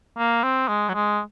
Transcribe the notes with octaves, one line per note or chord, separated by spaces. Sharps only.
A#3
C4
G#3
F#3
G#3